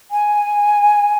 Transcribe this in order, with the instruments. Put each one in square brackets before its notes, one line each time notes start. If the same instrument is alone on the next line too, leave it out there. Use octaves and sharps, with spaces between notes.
[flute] G#5